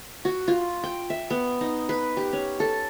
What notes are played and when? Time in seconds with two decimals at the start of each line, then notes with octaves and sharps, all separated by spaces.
0.25 F#4
0.48 F4
0.84 G5
1.10 E5
1.30 B3
1.61 D#4
1.89 B4
2.17 G4
2.33 C#4
2.60 A4